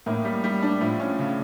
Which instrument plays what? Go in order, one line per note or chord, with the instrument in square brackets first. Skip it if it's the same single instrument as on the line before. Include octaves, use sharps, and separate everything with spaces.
[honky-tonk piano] A2 [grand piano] A#3
[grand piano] G3
G3
D4
[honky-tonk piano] A2 [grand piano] F3
[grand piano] C#4
C#3